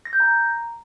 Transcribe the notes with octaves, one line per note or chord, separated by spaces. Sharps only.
A#6
G6
A#5